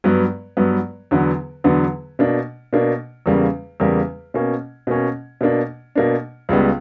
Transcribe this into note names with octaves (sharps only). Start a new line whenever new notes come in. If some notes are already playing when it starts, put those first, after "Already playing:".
G2 F#3 B3
G2 F#3 B3
E2 D3 F#3 B3
E2 D3 F#3 B3
B2 A#3 D4
B2 A#3 D4
E2 C#3 G3 A#3
E2 C#3 G3 A#3
B2 A#3 C#4
B2 A#3 C#4
B2 A#3 D4
B2 A#3 D4
C#2 C#3 G3 B3